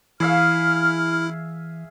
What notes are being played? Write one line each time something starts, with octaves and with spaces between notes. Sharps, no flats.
E3 E4 G#4 E5 F5 F6